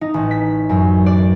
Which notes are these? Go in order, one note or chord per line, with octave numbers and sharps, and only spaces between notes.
D#4
A1
B6
F#2
D5